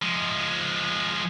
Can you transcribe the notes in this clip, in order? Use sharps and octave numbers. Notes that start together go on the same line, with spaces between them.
F3 G#3